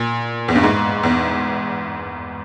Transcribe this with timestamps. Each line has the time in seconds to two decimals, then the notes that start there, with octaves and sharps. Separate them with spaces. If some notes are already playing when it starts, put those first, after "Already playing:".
Already playing: A#2
0.48 E2
0.55 G2
0.63 G#2
1.03 E2